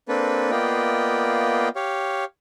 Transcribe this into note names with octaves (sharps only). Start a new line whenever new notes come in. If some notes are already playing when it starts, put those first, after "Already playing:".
A#3 C4 D4 A4 B4
A#3 B3 F4 D5 D#5 G5
G4 C#5 F5